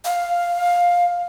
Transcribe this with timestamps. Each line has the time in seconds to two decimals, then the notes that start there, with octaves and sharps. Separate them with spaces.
0.05 F5